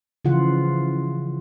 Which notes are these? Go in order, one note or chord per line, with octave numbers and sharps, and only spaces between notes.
C#3 E3 F3 F4 F#5